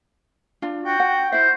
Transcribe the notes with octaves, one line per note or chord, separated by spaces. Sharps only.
D4 F4
F#4 G5
F#5
E4 C5 E5